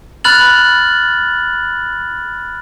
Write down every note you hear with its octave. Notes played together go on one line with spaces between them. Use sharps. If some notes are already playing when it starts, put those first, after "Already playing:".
B5 F6 F#6 A6 F#7